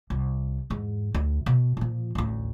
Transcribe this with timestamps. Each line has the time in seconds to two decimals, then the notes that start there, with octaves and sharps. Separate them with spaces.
0.10 C2
0.70 E2 G#2
1.14 D2
1.46 B2
1.77 A#2 F3
2.15 A1 D2